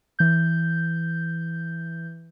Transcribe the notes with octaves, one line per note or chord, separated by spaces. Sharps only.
E3 G6